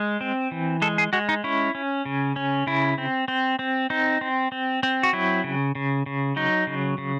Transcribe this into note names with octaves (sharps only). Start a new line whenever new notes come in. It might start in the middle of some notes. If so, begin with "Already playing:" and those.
Already playing: G#3
C4
E3
G#3 A4
G#4
G#3 F#4
D#4
C#4 E4
C#4
C#3
C#4
C#3 E4
C4
C4
C4
C4 D#4
C4
C4
C4
F#4
F#3 E4
C#3
C#3
C#3
F#3 D#4
C#3
C#3